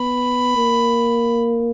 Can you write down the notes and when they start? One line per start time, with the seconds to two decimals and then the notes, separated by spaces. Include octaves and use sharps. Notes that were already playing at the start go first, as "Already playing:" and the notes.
Already playing: B3 B5
0.57 A#3